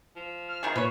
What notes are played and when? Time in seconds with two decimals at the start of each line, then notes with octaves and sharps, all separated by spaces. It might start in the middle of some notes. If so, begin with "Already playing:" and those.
0.16 F3
0.48 F6
0.63 C3 D#3 G#4
0.76 A#2 F3 B4 C#5